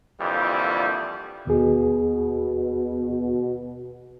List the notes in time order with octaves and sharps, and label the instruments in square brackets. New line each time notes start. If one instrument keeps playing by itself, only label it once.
[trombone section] F2 A#2 D3 E3 G3
[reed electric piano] D#2 G#4 [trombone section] B2